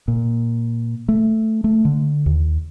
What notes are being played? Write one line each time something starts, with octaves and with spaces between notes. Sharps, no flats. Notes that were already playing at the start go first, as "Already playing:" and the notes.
A#2
A3
A3
D3
D#2